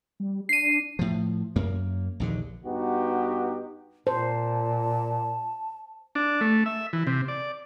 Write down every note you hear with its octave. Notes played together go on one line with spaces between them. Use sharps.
G3
D4 C7 D#7
A2 F3
F#2 A#3
A#1 D#2 D3
G2 B3 D#4 F#4 G4
A#2 C5 A5
D4
A3
E5
E3
C3
D5